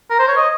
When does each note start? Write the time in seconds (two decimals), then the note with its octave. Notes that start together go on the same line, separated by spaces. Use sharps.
0.10 A#4
0.19 C5
0.28 C#5
0.37 D#5